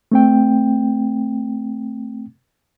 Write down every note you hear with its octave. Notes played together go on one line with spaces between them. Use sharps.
A3 C4 G5